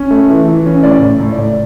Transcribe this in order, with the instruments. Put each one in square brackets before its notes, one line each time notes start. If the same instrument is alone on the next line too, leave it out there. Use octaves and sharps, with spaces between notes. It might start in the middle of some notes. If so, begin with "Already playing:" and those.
Already playing: [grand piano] C#4
A3
E3
E3
C#4
A2 D5
A2
A2
D5
A2